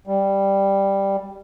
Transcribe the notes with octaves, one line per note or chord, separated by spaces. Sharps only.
G3